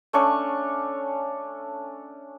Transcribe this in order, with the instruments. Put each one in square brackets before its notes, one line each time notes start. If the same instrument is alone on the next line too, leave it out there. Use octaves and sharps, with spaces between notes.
[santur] A3 C#4 D4 C#6